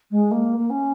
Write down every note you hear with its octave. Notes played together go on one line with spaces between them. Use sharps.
G#3
A#3
A#3
C#4